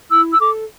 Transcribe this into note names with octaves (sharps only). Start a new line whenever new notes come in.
E4 E6
E6
A4 D6